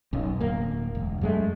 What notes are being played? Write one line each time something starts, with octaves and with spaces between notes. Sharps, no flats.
B1 F#2
D1 A#3
E1
F#2 G#3 A3